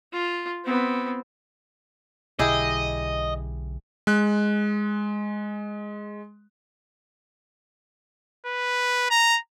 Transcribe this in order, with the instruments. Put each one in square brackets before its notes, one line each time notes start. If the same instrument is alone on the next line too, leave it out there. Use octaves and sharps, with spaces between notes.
[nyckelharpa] F4
B3 C4
[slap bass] B1 D3 [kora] E4 G4 G#4 [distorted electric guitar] D#5
[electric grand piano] G#3 F#6
[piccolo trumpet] B4
A#5